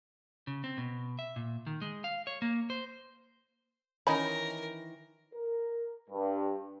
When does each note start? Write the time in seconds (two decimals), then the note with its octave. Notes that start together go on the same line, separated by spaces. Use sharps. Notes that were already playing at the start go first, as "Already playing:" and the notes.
0.47 C#3
0.64 C4
0.78 B2
1.19 E5
1.36 A#2
1.67 D#3
1.82 G#3
2.04 F5
2.27 C#5
2.42 A#3
2.70 C5
4.07 D#3 E3 C#4 D#4 A#4 A#5 B5
5.34 A#4
6.10 G2